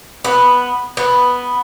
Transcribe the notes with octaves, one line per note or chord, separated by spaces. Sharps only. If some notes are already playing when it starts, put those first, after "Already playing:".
B3
B3